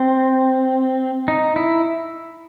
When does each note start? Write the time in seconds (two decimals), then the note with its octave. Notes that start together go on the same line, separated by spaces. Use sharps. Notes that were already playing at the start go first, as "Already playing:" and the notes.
Already playing: C4
1.28 D#4
1.56 E4